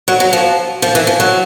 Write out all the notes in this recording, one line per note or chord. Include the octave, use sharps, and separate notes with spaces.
F#3
F#3
F3
F3
E3
F3
F#3